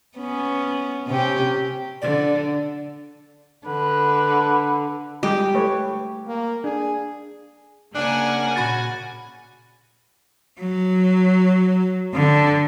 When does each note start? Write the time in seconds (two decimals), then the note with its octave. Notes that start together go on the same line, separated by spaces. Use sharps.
0.18 B3 C#4
1.07 C3 C#4 G4
2.02 D3 D5
3.67 D3 B4
5.23 G3 G#3 G4 D#5
5.54 A3 B4 C#5
6.27 A#3
6.64 D4 G#4
7.95 C#3 A#3 D4 F#5 G#5
8.56 A#2 F#4 B5 A6
10.60 F#3
12.14 D3